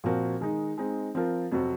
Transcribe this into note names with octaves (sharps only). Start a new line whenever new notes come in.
A#2 F3 C4 F#4 A#4
D#3 G#3 D#4
G#3 C4 D#4
F3 C4 F4 A#4
F2 C3 F#3 C4 F#4